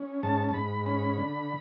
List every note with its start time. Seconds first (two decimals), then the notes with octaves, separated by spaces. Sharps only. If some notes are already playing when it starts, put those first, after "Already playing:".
Already playing: C#4
0.23 G#2 A5
0.49 A5
0.54 G#2 B5
0.86 C#4 B5
1.18 D3